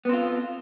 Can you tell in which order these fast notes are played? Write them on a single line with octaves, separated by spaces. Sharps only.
B3 C4 F4